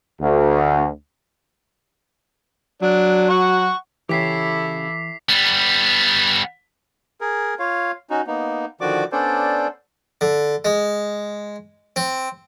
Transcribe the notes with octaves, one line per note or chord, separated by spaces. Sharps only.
D2
F#3 D4
F#5 C#6
C#3 E3 E4 G4 A4 D6 B6 C7
G3 B3
G#4 A#4
F4 C#5 F5
C#4 D#4 F#4
A#3 B3 D#4
D3 D#3 F3 F#4 D5 D6
B3 C#4 D4 A4 C5 D5
D3
G#3
C4